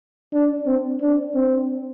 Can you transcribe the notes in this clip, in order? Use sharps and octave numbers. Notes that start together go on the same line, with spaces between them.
D4
C4
D4
C4